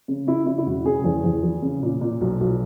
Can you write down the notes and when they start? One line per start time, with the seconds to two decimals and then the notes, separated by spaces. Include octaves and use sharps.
0.08 C#3
0.27 C#3 E4
0.46 C#3 E4
0.58 E4
0.66 E1 F#4
0.85 C#3 G#4
1.04 E2 G#4
1.24 E2
1.43 E3
1.62 C#3
1.83 A#2
2.01 A#2
2.21 B1
2.40 B1